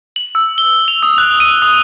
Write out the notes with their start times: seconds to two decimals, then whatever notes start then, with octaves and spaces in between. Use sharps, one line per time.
0.16 F#7
0.35 E6
0.58 G7
0.88 F7
1.03 D#6
1.18 F#6
1.40 D#7
1.62 D#6